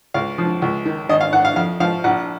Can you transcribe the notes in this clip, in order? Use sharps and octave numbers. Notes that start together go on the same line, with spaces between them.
C#2 F5
F3
C#2
D#3
G#1 D#5
F5
D#3 F#5
F5
F2 F5
F3 F5
A#1 F#5